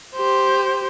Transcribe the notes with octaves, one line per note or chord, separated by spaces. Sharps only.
G4 C5